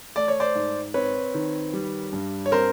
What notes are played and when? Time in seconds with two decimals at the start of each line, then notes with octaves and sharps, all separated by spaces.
0.15 A3 D5
0.28 C#5
0.40 C5 D5
0.55 G#2
0.94 C4 B4 C#5
1.34 D#3
1.73 G3
2.13 G2
2.46 C#5
2.52 C4 A#4 C5